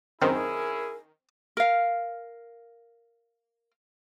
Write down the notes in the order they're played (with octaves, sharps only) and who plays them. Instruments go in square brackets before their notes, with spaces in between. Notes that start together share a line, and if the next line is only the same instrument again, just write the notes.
[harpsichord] F#2 C4 [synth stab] D#3 [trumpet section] C#4 E4 G#4 [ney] A#4
[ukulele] A#4 F5